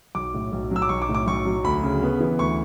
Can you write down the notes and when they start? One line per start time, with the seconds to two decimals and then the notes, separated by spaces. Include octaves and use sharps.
0.15 B1 D6
0.34 A2
0.52 B1
0.71 F#3 E6
0.82 D6
0.89 B1 C#6
1.02 D6
1.09 A2
1.14 D6
1.27 B1 C#6
1.45 F#3
1.64 D2 B5
1.83 C#3
2.03 B3
2.20 E3
2.39 D2 C#6